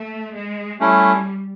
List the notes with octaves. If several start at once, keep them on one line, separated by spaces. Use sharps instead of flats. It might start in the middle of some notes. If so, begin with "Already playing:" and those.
Already playing: A3
G#3
G3 A3 C#4 E4